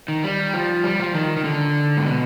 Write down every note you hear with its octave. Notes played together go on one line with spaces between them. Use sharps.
D#3
G3
F3
G3
F3
D#3
D#3
D3
G#2
B2